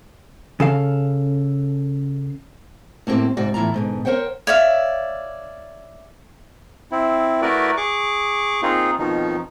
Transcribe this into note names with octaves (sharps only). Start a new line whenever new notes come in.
C#3 A4 F5
A2 A#3 C4 D#4 G4 C5
G#2 C3 F#4 D5
A2 E3 E4 F4 D5 A#5
G#2 B2 D3
A#4 C5 C#5 F#5 G5
C#5 D5 E5 F5
C4 E4
A3 E4 F#4 A#4 B4 D5
G#4 C#6 D6
A#3 C4 D#4 F4 G#4
F2 B2 D#3 F3 D#4